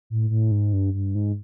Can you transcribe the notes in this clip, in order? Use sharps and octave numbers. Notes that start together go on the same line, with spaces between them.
A2
A2
G#2
G2
G2
G#2